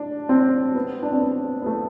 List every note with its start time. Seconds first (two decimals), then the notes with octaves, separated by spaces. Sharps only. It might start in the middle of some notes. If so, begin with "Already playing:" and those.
Already playing: D4
0.29 C4
0.75 B3
1.03 D4
1.12 C4
1.22 B3
1.62 B3
1.66 A3